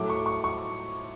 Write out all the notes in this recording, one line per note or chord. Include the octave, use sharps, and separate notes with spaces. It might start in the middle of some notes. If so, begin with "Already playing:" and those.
Already playing: A2 F#3 A3 D6
C#6
C#6
C#6